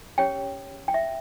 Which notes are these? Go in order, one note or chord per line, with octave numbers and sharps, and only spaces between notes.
C#4 G4 C#5 G5
G5
E5